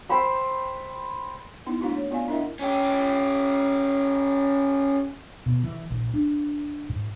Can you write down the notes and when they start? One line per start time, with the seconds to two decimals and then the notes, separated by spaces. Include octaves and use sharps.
0.09 C5 G5 B5 E6
1.66 B3 D#4 E4
1.81 A3 A#3 D4 E4 F#4
1.96 C#5
2.11 B3 F4 D5 F5 G#5
2.28 D4 E4 A#4 D#5 E5 F#5
2.59 C#4 G4
5.46 B2
5.63 E3
5.90 A#1
6.14 D4
6.90 G#2